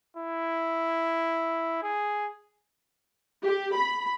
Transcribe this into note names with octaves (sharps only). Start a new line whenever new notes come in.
E4
G#4
G4
B5